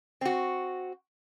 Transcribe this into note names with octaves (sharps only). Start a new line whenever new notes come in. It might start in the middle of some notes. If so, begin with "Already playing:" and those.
C4 F#4